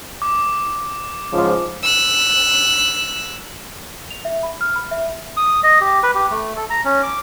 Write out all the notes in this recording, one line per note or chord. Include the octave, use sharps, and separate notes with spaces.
D6
G#2 C#3 F3
E6 F#6
F7
E5
B5
F6
B5
E5
D#6
D#5
G4
B4
G4
A3
A4
A#5
C#4
D6